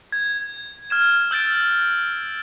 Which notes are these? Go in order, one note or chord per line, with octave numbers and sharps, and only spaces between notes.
G#6
F6 G#6 E7
E6 G6 A6 D7